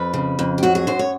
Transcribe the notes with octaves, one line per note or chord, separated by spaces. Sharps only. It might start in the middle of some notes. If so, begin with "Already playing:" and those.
Already playing: F2 B4
C#3
F2
G4
F#3 F#4
G#4
F#2 C5
C#5